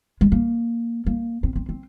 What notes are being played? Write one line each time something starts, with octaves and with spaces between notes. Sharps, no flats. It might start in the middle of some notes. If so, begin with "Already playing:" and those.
G#3
A#3
A#3
C4
C4
C4